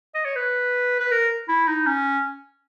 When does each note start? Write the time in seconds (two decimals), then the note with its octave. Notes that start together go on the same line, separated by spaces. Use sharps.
0.15 D#5
0.25 C#5
0.36 B4
1.00 B4
1.11 A#4
1.48 E4
1.67 D#4
1.86 C#4